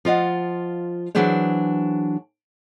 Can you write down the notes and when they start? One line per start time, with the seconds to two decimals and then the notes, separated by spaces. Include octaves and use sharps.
0.05 F3 F4 D#5 F#5
1.15 E3 F#3 D4 G#4 C5 C#5